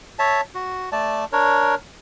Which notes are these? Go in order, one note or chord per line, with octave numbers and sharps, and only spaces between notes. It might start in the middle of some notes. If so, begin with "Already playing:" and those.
C#5 E5 A5
F#4
A3 D5 A5
D4 A#4 C#5